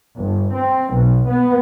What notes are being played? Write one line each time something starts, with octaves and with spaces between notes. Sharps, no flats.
G1
C4
B1
B3